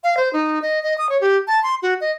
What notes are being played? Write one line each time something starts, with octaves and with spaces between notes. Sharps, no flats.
F5
C5
D#4
D#5
D#5
D#6
C#5
G4
A5
C6
F#4
D#5